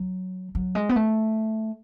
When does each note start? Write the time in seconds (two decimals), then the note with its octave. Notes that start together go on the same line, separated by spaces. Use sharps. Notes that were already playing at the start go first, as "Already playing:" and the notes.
Already playing: F#3
0.55 F#3
0.75 G#3
0.89 B3
0.96 A3